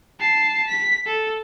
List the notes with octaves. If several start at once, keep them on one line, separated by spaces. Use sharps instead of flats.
A5 C7
B6
A4